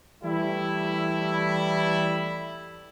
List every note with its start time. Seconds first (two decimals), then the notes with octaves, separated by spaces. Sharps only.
0.24 E3 G3 A3 E4